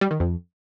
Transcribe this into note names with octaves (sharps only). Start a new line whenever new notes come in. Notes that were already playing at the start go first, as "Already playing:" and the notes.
G3
D#3
F2